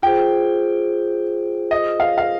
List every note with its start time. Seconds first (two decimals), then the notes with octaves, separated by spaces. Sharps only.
0.03 F4 G#4 C5 G5
1.71 D#5
2.00 F5
2.18 F5